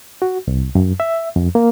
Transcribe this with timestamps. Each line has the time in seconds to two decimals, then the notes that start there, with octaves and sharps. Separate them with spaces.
0.22 F#4
0.48 C2
0.75 F#2
1.00 E5
1.36 F2
1.55 A#3